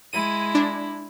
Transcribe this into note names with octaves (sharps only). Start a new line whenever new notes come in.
G#3 E4 D#7
D4